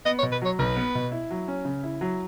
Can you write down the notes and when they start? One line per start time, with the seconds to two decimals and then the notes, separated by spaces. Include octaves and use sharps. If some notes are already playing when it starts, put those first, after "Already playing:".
0.05 B3 D#5
0.19 C#5
0.23 B2
0.32 B4
0.42 F#3 C#5
0.59 B1 B4
0.76 B3
0.95 B2
1.12 E4
1.31 F#3
1.48 C#4
1.65 C#3
1.83 E4
2.01 F#3